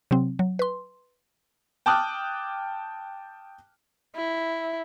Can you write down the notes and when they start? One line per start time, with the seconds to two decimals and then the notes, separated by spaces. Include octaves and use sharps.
0.11 C3 F#3 C4
0.39 F#3
0.59 B4 C6
1.86 G5 A5 D6 D#6 F6 F#6
4.16 E4